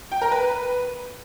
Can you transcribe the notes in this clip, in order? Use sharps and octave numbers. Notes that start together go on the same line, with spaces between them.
G5
A#4
B4